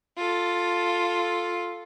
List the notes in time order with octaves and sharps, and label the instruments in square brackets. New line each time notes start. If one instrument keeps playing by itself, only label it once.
[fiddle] F4 A4